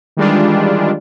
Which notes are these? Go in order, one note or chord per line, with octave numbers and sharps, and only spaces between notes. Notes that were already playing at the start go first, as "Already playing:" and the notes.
D#3 E3 G3 G#3 D4 F4